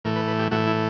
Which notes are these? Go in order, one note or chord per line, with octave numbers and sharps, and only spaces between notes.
A2 E3 A3 A#4
B4
B4
G4
A2 E3 A3 F#4
E4